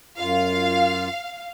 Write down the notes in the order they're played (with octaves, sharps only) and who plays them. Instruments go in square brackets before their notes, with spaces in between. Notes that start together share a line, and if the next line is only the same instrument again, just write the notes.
[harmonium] F#2 F4 [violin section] F5